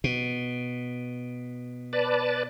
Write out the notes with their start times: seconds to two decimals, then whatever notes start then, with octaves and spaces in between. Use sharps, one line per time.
0.04 B2
1.93 B4 D5 A5